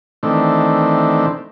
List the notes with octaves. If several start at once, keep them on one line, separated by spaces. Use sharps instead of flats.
D#3 E3 A3 C4 D4